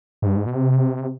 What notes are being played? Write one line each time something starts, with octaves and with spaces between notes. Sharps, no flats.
G#2
G2
G#2
B2
C3